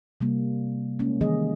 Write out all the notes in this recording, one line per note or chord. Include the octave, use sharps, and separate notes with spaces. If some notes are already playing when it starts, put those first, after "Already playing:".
C3 G3 A#3
G#3 A#3 C#4
D#3 E3 G3 A#3 G#4 D#5